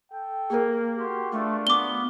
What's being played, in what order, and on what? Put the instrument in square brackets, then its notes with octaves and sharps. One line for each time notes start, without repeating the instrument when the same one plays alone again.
[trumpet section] A4 G5
[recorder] A#3 [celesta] G#4 A#4
[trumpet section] F#4 G4 C6
[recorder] A3 [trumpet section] D4 F4 C#6
[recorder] B3 [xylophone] D6 G7